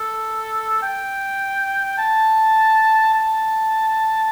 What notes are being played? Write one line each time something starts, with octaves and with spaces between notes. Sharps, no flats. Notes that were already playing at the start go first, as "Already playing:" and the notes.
Already playing: A4
G5
A5
A5